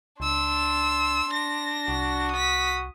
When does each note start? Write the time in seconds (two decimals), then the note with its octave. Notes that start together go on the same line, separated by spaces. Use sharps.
0.20 C#2 D4 C6 E6
1.29 D4 A#6
1.88 C2 F#4
2.32 D#6 B6